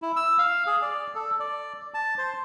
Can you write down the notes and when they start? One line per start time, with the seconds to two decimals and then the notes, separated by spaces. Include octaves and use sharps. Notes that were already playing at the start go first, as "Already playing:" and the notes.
0.02 E4
0.16 E6
0.39 F5
0.66 G#4
0.82 D5
1.15 A4
1.40 D5
1.94 A5
2.18 C5